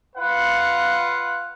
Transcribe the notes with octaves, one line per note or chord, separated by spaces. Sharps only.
F4 B4 F5 F#5